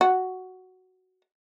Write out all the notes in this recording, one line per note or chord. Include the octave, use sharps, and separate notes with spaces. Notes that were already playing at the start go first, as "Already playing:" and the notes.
F#4